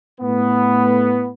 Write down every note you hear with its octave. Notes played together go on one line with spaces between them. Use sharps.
A2 A3 B3